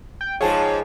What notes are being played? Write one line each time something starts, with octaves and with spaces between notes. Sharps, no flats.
G5
G#2 F3 G#4 C#5 F5 G5 A5